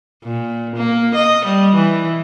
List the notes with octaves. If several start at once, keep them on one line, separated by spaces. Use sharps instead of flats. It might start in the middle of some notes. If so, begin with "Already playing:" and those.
A#2
A#3
D#5
G3
E3